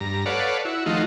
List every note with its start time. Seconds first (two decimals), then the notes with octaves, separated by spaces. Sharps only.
0.01 G2 A#5
0.26 A4 B4 C#5 D5 F5 F#5
0.65 E4 F#4
0.86 D#3 F3 A3 D#4 F4 F#4